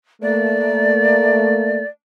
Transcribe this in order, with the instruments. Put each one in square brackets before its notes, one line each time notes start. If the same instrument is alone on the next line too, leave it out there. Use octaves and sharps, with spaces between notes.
[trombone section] A3 A#3 [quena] D5